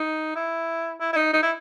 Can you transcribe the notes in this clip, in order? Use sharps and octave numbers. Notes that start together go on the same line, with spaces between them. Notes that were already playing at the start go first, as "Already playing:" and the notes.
Already playing: D#4
E4
E4
E4
D#4
D#4
E4